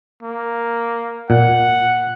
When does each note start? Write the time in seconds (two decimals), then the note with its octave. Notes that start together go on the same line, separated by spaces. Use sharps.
0.23 A#3
1.30 A#2 F#5